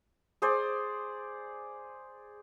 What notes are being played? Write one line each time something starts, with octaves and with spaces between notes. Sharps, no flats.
G#4 C5 D5